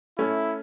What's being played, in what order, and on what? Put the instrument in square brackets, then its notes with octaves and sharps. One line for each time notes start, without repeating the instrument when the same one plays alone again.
[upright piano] A3 C#4 [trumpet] E4